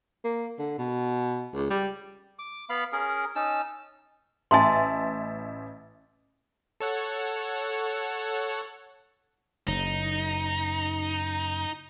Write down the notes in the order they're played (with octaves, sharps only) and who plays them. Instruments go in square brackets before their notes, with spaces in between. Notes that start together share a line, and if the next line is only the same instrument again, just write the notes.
[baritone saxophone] A#3
D3
B2
C#2
G3
[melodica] D6
B3 F5 B5
C#4 G#4 A#4
C#4 D#4 A5 E6
[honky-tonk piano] A1 E5 A6 [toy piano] G#5 A5 C6
[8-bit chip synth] A4 C#5 F#5
[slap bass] F#1 [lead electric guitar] D#4